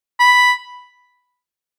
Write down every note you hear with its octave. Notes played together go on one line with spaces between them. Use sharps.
B5